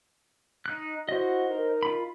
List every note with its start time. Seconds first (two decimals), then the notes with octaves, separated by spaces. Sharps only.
0.66 D#4 F#6
1.09 E4 F#4 C5 D#5
1.50 D#4 A#4
1.83 F4 B5